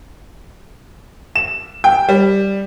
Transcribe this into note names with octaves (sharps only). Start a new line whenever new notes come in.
E7
G5
G3